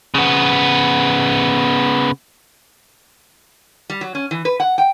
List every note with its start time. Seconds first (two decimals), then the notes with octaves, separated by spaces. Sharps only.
0.14 C#3 B3
3.90 G3
4.01 F#3
4.15 C#4
4.31 E3
4.45 B4
4.60 F#5
4.78 G5